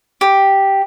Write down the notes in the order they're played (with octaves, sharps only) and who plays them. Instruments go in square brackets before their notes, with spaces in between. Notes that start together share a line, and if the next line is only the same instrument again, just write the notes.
[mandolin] G4